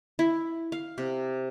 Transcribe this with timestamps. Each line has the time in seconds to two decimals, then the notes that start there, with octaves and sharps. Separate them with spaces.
0.19 E4
0.72 F5
0.98 C3